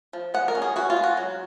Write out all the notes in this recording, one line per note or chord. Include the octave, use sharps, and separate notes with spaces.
F3
G#3 F#5
A#4
C#4
G#4
C#4 F#4
F4
G#3
F#4
F#3